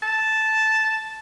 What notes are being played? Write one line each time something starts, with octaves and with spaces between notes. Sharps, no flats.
A5